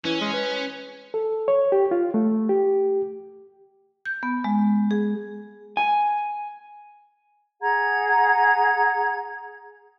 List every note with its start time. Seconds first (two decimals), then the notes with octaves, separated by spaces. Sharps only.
0.05 E3 C#4
0.21 G#3
0.33 B4
1.14 A4
1.48 C#5
1.72 G4
1.91 F4
2.14 A3
2.49 G4
4.05 G6
4.23 B3
4.44 G#3
4.91 G#4
5.77 G#5
7.61 G#4 F#5 A#5 G#6